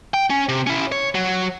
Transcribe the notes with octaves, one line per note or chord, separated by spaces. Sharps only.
G5
C#4
C3
C#4 E4
C#5
F#3